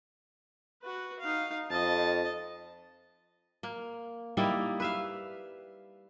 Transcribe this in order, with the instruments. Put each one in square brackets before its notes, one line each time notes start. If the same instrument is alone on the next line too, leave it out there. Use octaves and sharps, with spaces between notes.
[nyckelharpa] F#4 B4
D#4 F5
[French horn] F2 [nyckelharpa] D#5 A5
[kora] A#3
G3 A#3 D#4 E4
B4 E5 F5